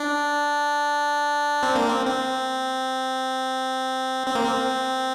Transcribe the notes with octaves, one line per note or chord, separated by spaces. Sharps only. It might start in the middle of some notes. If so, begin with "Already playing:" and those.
Already playing: D4
C4
A#3
C4
C4
C4
A#3
C4